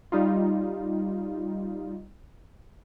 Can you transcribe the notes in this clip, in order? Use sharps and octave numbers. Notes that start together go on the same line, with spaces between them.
G3 D#4 F4